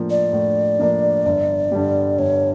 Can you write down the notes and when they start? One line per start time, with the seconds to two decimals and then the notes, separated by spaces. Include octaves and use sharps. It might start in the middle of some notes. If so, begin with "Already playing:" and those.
Already playing: A2 F3 A#3 D4
0.10 D5
0.33 A2
0.79 F3 A#3 D4
1.25 G1
1.72 G2 D3 G3
2.18 G1 C#5